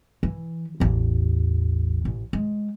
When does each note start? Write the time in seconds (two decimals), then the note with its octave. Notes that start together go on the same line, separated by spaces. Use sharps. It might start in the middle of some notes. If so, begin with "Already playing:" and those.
0.23 E3
0.80 A1 E2
2.05 A1
2.33 G#3